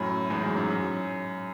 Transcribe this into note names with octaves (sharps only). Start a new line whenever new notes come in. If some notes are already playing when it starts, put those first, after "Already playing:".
Already playing: F#2 A2
E2 G#2
F#2
F#2
F#2